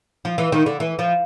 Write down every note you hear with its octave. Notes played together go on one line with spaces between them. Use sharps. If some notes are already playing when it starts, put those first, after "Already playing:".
F3
E3
D#3
D3
E3
F3